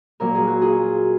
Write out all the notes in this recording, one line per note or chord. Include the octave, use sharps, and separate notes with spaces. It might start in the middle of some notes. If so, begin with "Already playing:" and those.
A#2 F#3 A#3 A#4
G#4
F#4
F4 G#4